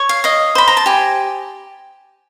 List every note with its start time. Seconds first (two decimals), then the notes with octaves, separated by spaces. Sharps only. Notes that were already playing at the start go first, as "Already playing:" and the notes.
Already playing: C#5
0.09 F5
0.24 D#5 F5
0.55 C5 B5
0.68 A#5
0.77 A5
0.86 G4 G#5